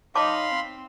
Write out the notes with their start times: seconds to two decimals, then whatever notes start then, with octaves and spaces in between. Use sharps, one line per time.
0.15 D#4 C#5 F5 A5 B5 C6 D6
0.51 C4